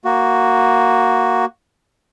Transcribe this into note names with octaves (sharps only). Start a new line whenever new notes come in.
A#3 F#4